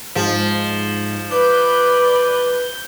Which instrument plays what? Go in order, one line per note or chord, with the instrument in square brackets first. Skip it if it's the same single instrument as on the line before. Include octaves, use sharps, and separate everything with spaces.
[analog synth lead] G#2 [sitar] F3
[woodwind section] B4 [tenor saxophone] D5 [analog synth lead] G6